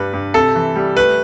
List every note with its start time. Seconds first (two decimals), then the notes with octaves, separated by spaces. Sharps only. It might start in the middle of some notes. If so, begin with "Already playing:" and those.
Already playing: G2 D4 B4
0.13 G2
0.34 C3 A4
0.55 E3
0.76 G3
0.97 A3 B4